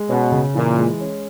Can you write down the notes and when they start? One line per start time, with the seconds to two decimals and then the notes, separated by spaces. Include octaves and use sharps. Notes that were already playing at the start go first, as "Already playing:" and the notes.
Already playing: G#3
0.09 B2 C#4
0.32 C#3
0.54 A#2 E3
0.78 G#3
1.01 C#4